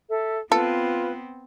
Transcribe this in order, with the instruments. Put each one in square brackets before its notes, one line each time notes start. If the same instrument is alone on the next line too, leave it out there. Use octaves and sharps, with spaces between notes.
[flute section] A4 E5
[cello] B3 C4 [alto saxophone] F4 [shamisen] A4 [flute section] B4